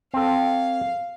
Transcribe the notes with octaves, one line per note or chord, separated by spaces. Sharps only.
C4 A4 F5